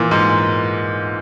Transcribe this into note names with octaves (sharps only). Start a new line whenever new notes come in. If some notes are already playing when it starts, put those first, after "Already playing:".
Already playing: A#2 E3
G#2